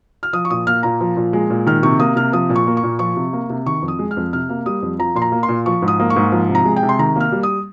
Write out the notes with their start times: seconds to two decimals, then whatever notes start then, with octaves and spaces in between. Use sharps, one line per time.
0.23 F6
0.33 F3 D#6
0.45 C#6
0.50 A#2 D#6
0.67 A#3 F6
0.83 A#2 A#5
1.01 F3
1.17 A#2
1.33 G#3
1.50 A#2
1.66 D#3 F6
1.83 C3 C#6
1.99 A#3 D#6
2.16 C3 F6
2.33 F3 D#6
2.50 A#2
2.56 C#6
2.67 A#3
2.77 C#6
2.83 A#2
2.99 F3 C#6
3.17 C3
3.33 A#3
3.50 C3
3.66 D#3 C#6
3.82 F2
3.88 D#6
3.99 G#3
4.11 F6
4.17 F2
4.33 C3 F6
4.49 A#3
4.66 G3 D#6
4.82 F2
4.99 F3 A#5
5.15 A#2 C6
5.22 A#5
5.32 A#3
5.43 C6
5.49 A#2
5.66 F3 C#6
5.82 G#2
5.88 D#6
6.00 A#3
6.10 C#6
6.16 G#2
6.32 F3
6.49 C3
6.55 A#5
6.65 G#3
6.76 G5
6.83 C3
6.89 C6
6.99 D#3 A#5
7.16 A#3 F6
7.32 G3
7.43 D#6